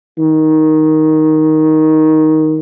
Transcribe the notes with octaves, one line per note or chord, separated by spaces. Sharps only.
D#3